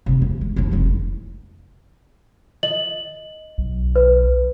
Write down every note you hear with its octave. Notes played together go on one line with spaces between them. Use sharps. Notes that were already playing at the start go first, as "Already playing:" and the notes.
C3 D#3
E2
G#3
F#2 F3
F1 E4
D#5 F#7
B1
B4